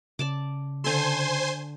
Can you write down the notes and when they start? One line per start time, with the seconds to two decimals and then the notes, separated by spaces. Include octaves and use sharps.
0.19 C#3 D5 A5 D6
0.84 D3 A4 C5 G#5 C6